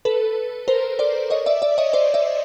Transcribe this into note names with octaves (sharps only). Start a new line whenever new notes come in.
A4 B4
A#4 C5
C5 D5
C#5 D#5
D5 E5
D5 E5
C#5 D#5
C5 D5
D5 E5